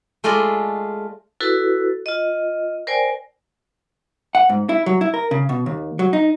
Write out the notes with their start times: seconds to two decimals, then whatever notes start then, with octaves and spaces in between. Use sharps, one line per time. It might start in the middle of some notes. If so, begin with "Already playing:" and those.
0.24 G#3 A3 F4 D5 D#5 B5
1.41 E4 F#4 A4 B4
2.06 F4 D#5
2.87 A#4 C5 D5 G5 G#5
4.35 F#5
4.49 G#2
4.69 E4
4.86 F#3
5.01 E4
5.14 A#4
5.31 C#3
5.49 B2
5.66 D#2
5.99 F#3
6.13 D#4